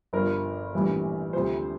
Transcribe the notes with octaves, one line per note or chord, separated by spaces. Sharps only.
G1 G2 F3 A#4
A#1 A2 E3 G3
D2 C3 F3 C5